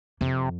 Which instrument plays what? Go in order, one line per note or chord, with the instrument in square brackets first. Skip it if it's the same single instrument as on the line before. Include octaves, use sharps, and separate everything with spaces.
[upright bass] F2 [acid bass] C3